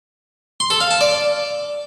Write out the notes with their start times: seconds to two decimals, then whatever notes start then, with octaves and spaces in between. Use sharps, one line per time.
0.60 C6
0.70 A4
0.80 F5
0.91 A5
1.01 D5